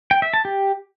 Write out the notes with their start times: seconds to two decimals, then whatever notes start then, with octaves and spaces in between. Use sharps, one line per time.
0.11 G5
0.22 E5
0.34 A5
0.45 G4